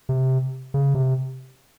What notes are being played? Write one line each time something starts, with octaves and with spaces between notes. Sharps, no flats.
C3
C#3
C3